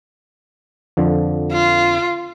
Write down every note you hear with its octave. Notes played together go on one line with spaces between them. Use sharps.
F2 D3 F3
F4